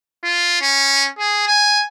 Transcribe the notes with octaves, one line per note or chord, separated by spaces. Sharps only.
F4
C#4
G#4
G#5